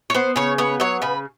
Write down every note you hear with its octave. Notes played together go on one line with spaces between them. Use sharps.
C#5
B3 C5
C#3 C#5
B3 C#5
F#3 C#5
C#3 B4